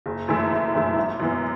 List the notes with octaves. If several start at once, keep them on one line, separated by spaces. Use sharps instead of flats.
F#1
F#2 E3 A3 E4
F#1
F#2 E3 A3 E4
G#1
F#2 E3 B3